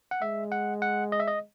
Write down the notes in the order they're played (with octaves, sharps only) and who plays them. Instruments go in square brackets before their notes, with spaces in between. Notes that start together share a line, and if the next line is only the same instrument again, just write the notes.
[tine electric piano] F#5
[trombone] G#3 [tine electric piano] E5
[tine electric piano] F#5
F#5
D#5
E5
D#5